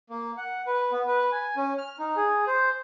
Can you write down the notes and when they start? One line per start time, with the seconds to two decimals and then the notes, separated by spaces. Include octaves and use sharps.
0.10 A#3
0.37 F#5
0.66 B4
0.92 B3
1.07 B4
1.32 G#5
1.56 C#4
1.78 F6
1.99 D#4
2.16 G#4
2.47 C5